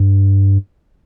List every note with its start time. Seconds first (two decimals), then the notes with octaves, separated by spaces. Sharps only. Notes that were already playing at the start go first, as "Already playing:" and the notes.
Already playing: G2